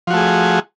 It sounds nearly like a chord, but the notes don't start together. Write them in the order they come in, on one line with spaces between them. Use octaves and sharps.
F3 F#4 A3 G#4